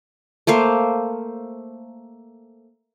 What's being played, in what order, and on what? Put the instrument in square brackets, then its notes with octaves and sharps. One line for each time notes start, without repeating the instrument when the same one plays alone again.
[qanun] A3 A#3 C5 F5